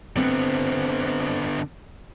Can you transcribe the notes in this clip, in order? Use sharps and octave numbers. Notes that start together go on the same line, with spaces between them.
D3 B3 C4